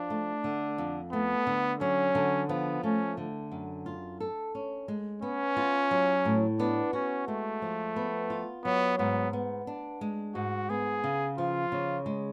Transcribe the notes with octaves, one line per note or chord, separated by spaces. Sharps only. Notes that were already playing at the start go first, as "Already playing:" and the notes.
Already playing: F3 D4
A3
D3
F2
A3 B3
D3
F#3 C#4
D3
F3 B3
A3 C#4
D3
F#2
F4
A4
C#4
G#3
B3 C#4
F4
F#3
A2
B3 D4
C#4 F#4
G#3 A3
F3
B3
F4
F#3 B3
G#2 B3
B3
D4
G#3
G#2 F#4
B3 G#4
C#3
F3 F4
C#3
G#3